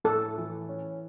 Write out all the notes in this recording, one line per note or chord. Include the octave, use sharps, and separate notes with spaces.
A2 A4
E3
C#4